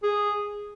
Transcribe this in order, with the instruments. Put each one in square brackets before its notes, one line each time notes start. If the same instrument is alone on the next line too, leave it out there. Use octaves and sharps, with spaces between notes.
[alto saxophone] G#4